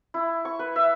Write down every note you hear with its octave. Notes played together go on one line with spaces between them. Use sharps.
E4
C#6
B4
E5